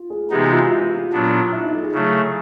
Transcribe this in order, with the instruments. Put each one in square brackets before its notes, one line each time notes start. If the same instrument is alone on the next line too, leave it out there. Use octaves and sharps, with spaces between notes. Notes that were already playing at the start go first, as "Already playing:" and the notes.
Already playing: [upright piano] F4
G#4
[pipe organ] C3 E3 G#3 B3 D#4 [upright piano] G4
[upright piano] F#4
F4
E4
F4
[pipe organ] A#2 F#3 B3 D4
[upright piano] E4
D#4
A4
G#4
[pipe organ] C#3 F#3 A3